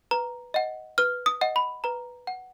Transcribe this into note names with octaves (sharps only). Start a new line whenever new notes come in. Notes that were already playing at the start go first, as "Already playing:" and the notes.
B4 A#5
D#5 F#5
B4 F6
D#6
D#5 F#5
B5
B4 A#5
F#5